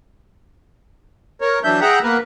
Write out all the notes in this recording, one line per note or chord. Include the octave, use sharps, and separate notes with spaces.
A#4 C#5
E3 F#3 D4 E5 G6
G#4 E5 F#5 G5 A#5
A#3 B3 A#4 B4